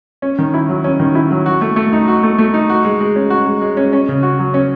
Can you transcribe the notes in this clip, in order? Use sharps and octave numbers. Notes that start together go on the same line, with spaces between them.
C#4
D#3
E4
F#3
C#4
D#3
E4
F#3
F#4
A3
A3
D#4
F#4
A3
A3
D#4
F#4
G#3
G#3
C#4
F#4
G#3
G#3
C#4
C#4
C#3
F#4
F#3
C#4